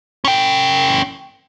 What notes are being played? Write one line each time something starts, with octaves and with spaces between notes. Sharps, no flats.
C#4 G5